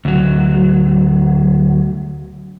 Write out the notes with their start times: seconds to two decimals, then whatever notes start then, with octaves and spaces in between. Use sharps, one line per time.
0.05 D2 F#3